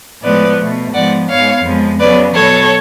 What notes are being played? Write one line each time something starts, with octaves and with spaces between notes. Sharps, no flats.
A2 F3 G#3 B3 B4 D5
B2 A3
G#2 F3 B3 D5 F#5
G#2 G#3 B3 C#5 F5
F2 F3 G#3 B3
C#3 F#3 B3 B4 D5
B2 F#3 B3 A4 C#5